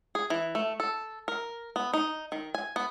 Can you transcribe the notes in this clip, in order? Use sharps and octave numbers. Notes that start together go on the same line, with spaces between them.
G#4
E3
A3
A4
A#4
B3
D#4
D#3
G#5
B3